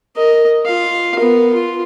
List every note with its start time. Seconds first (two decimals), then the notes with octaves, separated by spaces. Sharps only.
0.16 A#4 D#5
0.65 F4 F5
1.16 B3 A#4
1.54 F4